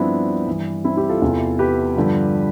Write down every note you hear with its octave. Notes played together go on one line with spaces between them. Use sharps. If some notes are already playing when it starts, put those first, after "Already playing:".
Already playing: G2 F3 B3 C4 D4 E4
G2 E3
C4 E4
E4 G4
F4 A4
E2 C3 E3
G4 B4
G2 D3 F3